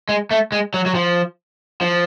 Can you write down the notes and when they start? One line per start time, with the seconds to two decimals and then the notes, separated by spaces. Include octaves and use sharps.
0.09 G#3
0.31 A3
0.52 G#3
0.74 F#3
0.86 F#3
0.95 F3
1.81 F3